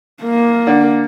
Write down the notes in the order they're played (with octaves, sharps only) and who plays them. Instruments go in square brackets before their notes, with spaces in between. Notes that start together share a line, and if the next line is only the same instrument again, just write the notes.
[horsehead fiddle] A#3
[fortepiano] D3